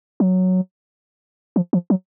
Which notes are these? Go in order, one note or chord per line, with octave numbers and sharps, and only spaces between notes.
F#3
F3
F3
F#3